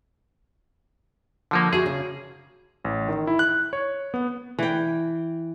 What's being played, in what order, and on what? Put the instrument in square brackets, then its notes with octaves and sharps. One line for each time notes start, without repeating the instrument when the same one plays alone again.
[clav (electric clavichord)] D3 F3 A#3
[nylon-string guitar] F#4 E5 [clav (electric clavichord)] G#4
[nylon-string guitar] C#3
[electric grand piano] A1
D#3
E4
F#6
C#5
B3
[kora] E3 G5